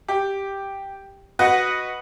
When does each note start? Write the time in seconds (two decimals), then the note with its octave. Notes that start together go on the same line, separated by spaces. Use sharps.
0.08 G4
1.39 F#4 B4 D#5 F#5